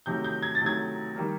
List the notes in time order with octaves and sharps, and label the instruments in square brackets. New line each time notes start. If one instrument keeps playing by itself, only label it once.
[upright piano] C3 D#3 F#3 A3 G6
G6
G#6
A6
C3 D#3 F#3 A3 G#6
D#3 G3 A#3